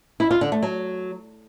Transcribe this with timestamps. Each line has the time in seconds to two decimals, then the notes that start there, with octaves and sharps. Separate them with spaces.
0.20 E4
0.31 F4
0.41 D3
0.52 A3
0.62 F#3